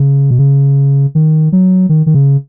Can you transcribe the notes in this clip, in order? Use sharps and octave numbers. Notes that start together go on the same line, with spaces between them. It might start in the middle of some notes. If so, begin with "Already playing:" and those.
Already playing: C#3
B2
C#3
D#3
F#3
D#3
D#3
C#3